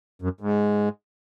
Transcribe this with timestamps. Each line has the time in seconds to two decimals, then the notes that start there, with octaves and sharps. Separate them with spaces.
0.22 F#2
0.40 G#2